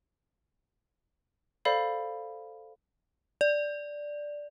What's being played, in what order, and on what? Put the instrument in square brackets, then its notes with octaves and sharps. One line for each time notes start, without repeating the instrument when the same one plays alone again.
[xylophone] A4 C5 D5 F5 B5
[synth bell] D5